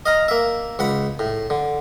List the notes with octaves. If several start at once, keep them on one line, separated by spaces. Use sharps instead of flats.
D#5 F5 A#5
A#3 E5
C#2 F#5 B5
A2
D3